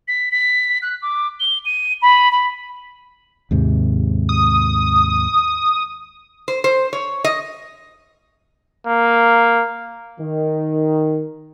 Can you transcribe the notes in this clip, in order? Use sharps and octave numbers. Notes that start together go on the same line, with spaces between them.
B6
B6
F#6
D6
G7
D#7
B5
B5
D#2 G#2 C3
D#6
C5
C5
C#5
D#5
A#3
D#3